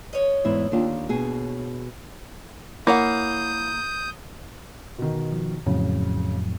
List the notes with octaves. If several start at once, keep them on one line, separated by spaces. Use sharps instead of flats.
C#5 D#5
E2 G#2 E4
D#2 D4 F4
B2 G#4
A#3 E4 C#5 F#5 D#6 G6
B2 D#3
F3
F2 A2 C#3 F#3